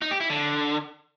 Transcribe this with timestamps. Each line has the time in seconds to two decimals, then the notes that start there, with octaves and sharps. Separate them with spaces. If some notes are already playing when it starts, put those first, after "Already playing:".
0.02 D#4
0.11 G4
0.20 E4
0.30 D3